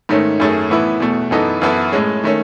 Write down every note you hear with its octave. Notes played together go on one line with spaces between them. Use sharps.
G#2 D#3 A3 C#4
F#2 D#3 A3 C#4 G#4
A2 E3 B3 E4
E2 B2 A3
F#2 E3 B3 D#4 A4
F#2 E3 B3 E4 A4
A2 G#3 C#4
D#3 A3 C#4